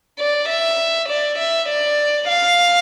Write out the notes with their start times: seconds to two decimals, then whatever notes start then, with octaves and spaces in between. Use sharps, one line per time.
0.19 D5
0.49 E5
1.09 D5
1.39 E5
1.69 D5
2.28 F5